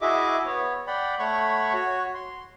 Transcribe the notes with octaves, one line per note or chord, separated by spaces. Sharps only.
E4 F#4 G#4 D#5 E5 D6
B3 C#5
D5 F#5 G5 B5
A3 C#5 F#5 B5 C#6
F#4 C#5
C6